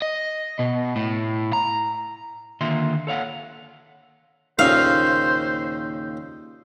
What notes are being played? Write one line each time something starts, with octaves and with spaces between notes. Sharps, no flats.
D#5
B2
A2
A#5
D3 D#3 A#3 F4 E5 C6
A4 C#5 F5 F#5
D#2 A#2 C#3 C5 F5